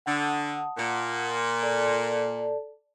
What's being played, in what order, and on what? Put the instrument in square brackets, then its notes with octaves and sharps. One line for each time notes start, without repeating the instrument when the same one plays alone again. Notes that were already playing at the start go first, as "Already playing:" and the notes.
[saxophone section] D3 [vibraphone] F#5 A5 D#6
[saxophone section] A#2
[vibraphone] A4 D5 A5